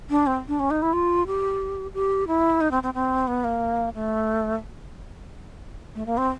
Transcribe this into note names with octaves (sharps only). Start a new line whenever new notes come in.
D4
C4
D4
C#4
D#4
E4
F4
G4
G4
E4
D#4
C4
C4
C4
B3
A#3
A3
A3
A#3
C4